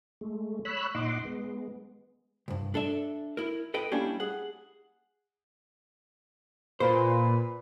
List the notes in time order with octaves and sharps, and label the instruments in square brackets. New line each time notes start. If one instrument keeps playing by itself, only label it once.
[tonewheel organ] G#3 A3
C#5 B5 E6 F#6
A#2 D#4 D#5 F#5 C6 D6
G#3 B3
[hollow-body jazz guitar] C2 G2
D4 A4 D5 E5
E4 A#4
A4 B4 D#5 G5
G3 A#3 C#4 D4 E4 G4
G#4 F#5
[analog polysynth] A#2 [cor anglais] B4 [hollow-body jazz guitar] C5